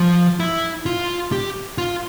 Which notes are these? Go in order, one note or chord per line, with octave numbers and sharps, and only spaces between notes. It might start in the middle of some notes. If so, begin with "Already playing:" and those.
Already playing: F3
E4
F4
G4
F4